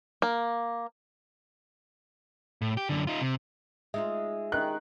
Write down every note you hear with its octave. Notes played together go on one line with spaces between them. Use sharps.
A#3
A2
G4
F#2 D3
D#4 F4
C3
G#3 D#4 F4 E5
D#3 F#6